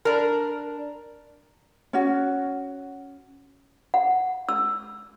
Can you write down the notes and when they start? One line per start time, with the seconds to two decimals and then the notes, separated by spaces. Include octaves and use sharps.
0.05 D4 A#4
1.93 C#4 F#4
3.94 F#5
4.49 E6